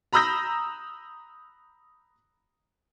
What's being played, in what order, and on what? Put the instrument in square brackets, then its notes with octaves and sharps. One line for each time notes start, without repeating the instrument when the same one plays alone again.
[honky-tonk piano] A#5 B5 D#6 E6 G6 A#6